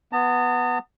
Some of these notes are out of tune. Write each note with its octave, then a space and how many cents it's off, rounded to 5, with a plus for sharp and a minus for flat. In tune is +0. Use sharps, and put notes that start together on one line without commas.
B3 +0 A5 +45